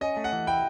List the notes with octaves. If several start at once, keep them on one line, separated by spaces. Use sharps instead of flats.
C#4 D#5
A3
F#5
E3
E4 G5